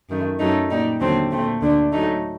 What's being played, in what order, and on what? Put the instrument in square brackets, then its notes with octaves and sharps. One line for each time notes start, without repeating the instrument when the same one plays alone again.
[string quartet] F#2 D#3 A3
F#2 F#3 A3 D#4
A#2 G3 D#4
D#2 D3 F#3 A3 C4
A#2 A3 C4
D2 D3 A3 D4
A2 F#3 A3 D#4